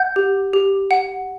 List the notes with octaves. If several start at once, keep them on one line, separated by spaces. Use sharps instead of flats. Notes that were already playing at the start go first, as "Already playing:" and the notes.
Already playing: F#5 G6
G4
G4
F#5